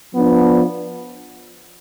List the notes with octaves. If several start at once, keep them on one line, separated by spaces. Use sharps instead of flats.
F3 B3 D4